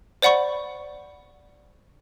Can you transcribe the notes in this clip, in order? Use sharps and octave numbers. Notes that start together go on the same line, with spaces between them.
C5 D5 F#5 B5 C#6